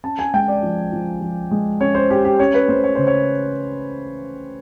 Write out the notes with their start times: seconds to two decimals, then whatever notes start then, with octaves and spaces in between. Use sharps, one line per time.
0.04 C#4 A5
0.19 G#5
0.34 G#3 G5
0.48 D5
0.63 F3
0.92 F3
1.21 F3
1.51 G#3
1.80 C#4 C#5
1.95 C5
2.10 C#4 G4
2.25 G4
2.39 C#4 C#5
2.54 B4
2.68 A3 C5
2.84 C#5
2.95 C#3 C5
3.07 C#5